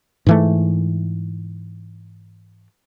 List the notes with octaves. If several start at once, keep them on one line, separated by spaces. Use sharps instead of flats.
G#2 E3 A3